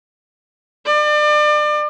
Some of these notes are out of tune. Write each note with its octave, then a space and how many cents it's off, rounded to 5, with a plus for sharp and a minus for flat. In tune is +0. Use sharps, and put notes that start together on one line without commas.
D5 +35